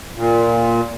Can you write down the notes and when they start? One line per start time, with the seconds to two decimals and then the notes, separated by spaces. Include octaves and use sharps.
0.16 A#2